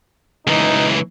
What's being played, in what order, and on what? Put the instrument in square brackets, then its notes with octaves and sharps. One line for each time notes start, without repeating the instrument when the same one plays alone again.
[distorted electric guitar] C#2 E3 [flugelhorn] D#4